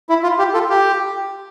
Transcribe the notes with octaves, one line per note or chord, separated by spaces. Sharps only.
E4
F4
G4
F4 A4
G4